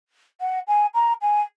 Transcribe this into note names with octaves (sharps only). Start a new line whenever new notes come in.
F#5
G#5
A#5
G#5